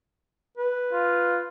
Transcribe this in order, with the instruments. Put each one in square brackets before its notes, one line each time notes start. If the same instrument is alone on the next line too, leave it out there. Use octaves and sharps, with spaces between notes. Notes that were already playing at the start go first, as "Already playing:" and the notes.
[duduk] B4
[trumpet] F4